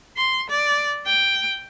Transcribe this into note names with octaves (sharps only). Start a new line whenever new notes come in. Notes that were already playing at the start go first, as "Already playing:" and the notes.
C6
D5
G5